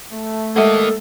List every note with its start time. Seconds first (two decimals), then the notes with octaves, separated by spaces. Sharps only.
0.12 A3
0.56 G#3 A#3 A4 D#5 E5